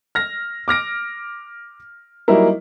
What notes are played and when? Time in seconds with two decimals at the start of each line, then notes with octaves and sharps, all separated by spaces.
0.15 F6 A#6
0.68 D6 F6 A#6 D7
2.28 F#3 G3 A#3 D#4 E4 A#4